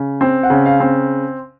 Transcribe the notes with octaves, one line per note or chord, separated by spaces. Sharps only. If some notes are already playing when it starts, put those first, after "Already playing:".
Already playing: C#3
C4
F#5
C#3
F5
C4